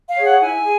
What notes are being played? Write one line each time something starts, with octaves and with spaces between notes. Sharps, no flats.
F5
G#4 C#5
F#5
E4 G#5
G#4